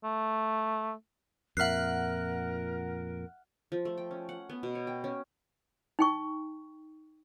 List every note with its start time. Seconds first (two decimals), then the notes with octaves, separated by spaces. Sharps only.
0.04 A3
1.57 F2 A#2 A#4 E5 F#5 F6 F#6 C7
3.72 F3
3.85 A3
3.97 G5
4.11 C#4
4.29 F#5
4.49 B3
4.63 B2
4.75 C#5
4.87 G5
5.04 C#4
5.99 D#4 G5 C#6